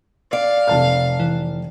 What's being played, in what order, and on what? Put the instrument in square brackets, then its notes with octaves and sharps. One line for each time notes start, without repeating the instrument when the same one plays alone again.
[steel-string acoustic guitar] D5 [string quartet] F5
[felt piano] F1 A5 F6
[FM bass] E3